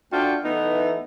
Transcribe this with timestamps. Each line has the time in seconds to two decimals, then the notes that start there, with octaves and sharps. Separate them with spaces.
0.11 A3 D4 F4 F#4 G5
0.44 E3 A3 B3 D#4 E4